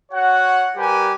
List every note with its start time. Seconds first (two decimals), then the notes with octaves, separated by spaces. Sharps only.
0.12 F#4 C#5 F#5
0.76 G3 G4 A#4 B4 G#5